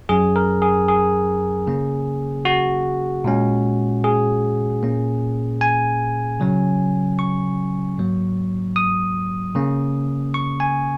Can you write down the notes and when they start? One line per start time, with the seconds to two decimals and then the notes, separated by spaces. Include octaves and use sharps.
0.09 F#2 F#3 C#4 G#4
0.36 A#4
0.62 G#4
0.88 G#4
1.67 C#3 A#3 C#4
2.45 F#4
3.24 A#2 G#3 C#4
4.04 G#4
4.83 A#2 A#3 C#4
5.61 G#5
6.40 C#3 F#3 C#4
7.19 C#6
7.98 G#2 F#3 A#3
8.76 D#6
9.55 C#3 A#3 C#4
10.34 C#6
10.60 G#5